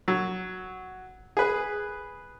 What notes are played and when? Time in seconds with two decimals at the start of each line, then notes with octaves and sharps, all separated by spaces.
0.08 F#3
1.37 G#4 B4